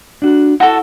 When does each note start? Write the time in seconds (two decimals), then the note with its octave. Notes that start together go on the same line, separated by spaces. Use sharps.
0.22 D4 F#4
0.60 E4 F#4 A4